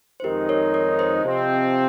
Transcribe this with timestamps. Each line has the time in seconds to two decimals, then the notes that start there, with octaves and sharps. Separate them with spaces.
0.20 C5
0.24 F2 D#3 G#3 D#4 G4 A#4
0.49 A#4 C#5
0.74 A#4 C#5
0.99 C5 D#5
1.24 C3 F3 C4